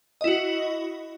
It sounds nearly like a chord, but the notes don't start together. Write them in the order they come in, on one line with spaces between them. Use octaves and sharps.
D#5 E4 F#4